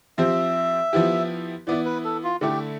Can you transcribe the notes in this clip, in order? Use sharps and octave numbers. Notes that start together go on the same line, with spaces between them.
F3 C4 G4 C5 E5
F3 B3 E4 G4
E3 B3 E4 D5
B4
A4
F4
D3 A3 E4 G4